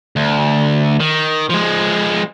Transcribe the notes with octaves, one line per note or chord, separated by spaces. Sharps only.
D2
D#3
F3 G#3